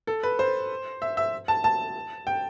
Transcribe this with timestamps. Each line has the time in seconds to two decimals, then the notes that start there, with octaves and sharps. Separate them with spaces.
0.07 A4
0.23 B4
0.39 C5
1.02 E5
1.17 E5
1.48 A5
1.64 A5
2.27 G5